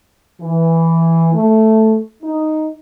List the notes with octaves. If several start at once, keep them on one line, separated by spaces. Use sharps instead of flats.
E3
A3
D#4